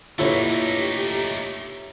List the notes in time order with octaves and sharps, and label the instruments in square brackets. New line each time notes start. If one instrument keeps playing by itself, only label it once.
[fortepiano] A#2 D3 B4 [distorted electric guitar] A3 D#4 [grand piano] E4 C#5 [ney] G4